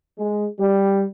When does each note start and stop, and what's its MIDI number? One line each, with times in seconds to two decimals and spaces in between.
0.19 0.47 56
0.60 1.04 55